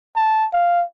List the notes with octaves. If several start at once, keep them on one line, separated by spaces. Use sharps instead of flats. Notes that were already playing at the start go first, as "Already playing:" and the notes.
A5
F5